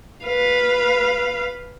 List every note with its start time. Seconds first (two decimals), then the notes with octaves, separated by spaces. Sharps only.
0.25 B4 F5